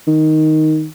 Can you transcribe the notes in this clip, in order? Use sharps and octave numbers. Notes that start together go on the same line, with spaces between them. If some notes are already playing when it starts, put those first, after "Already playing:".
D#3